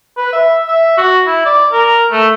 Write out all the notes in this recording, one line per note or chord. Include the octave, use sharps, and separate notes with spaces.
B4
E5
E5
F#4
E4
D5
A#4
A3